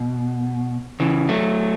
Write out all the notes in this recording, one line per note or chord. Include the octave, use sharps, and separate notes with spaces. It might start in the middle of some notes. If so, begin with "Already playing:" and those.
Already playing: B2
C#3 E3
F#3 A3